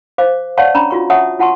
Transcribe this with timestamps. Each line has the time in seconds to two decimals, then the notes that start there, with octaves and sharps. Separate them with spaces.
0.18 C5 F5 D6
0.57 C#5 D5 F5 F#5 A5 C#6
0.74 C#4 D4 A#5 B5 C#6
0.91 F4 F#4 C#6
1.10 C#5 E5 F#5 A5 C#6 D#6
1.39 F4 F#5 A5 C6 C#6